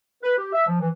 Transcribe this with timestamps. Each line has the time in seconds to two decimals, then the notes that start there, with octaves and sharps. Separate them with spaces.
0.24 B4
0.39 G4
0.53 E5
0.67 F3
0.81 E3